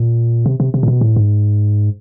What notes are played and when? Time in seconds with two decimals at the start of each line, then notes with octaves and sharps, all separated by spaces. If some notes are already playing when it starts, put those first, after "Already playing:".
Already playing: A#2
0.46 C3
0.60 C3
0.74 C3
0.83 A#2
0.88 B2
1.01 A2
1.16 G#2